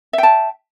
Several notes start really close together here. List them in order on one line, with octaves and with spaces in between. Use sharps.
E5 G5 A5